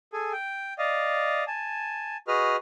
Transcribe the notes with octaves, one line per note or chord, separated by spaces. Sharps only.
G#4 A4 G#5
G5
D5 D#5 F5
G#5 A5
F#4 G#4 B4 D#5 F6